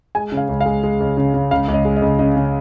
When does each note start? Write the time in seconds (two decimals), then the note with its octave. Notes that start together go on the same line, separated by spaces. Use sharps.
0.15 G#3 G#5
0.32 C#3
0.37 F5
0.49 C#2
0.61 F5
0.66 G#3
0.84 G#3
1.00 C#2
1.17 C#3
1.34 C#3
1.51 C#2 F5
1.68 C#2
1.74 D#5
1.85 G#3
1.96 D#5
2.02 C#2
2.19 C#3 D#5
2.36 C#3